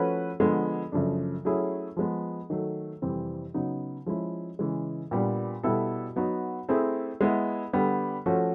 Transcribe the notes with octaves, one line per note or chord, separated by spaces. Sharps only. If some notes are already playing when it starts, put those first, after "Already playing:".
Already playing: F3 A3 C#4 F#4 B4
D3 F3 G#3 B3
F#2 C#3 F3 A3 D4
F#3 A3 C#4 E4 G#4
F3 G#3 B3
D#3 F#3 A3
F2 C3 E3 G3 C4
C#3 F#3 B3 D#4
F3 G#3 C#4 E4
C#3 E3 G#3
A#2 G3 B3 D4
B2 G3 B3 E4 A4
F#3 B3 D#4 F#4
A3 C4 E4 G#4
G#3 B3 E4
D3 G3 B3
F3 A3 C#4 F#4